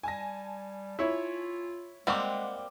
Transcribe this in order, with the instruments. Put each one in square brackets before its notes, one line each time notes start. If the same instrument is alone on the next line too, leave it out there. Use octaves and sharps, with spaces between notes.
[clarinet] G3 [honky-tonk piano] G#5 A5 A#6
[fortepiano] E4 C#5 [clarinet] F4
[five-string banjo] G3 A#3 C4 [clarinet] G#3 [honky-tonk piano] F#5 D6